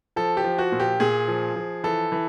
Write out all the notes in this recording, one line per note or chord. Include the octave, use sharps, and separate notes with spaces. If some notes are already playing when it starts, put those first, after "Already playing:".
F3 A4
G4
F3
F#4
A#2
G4
A#2 G#4
F3
F3
E3 A4
E3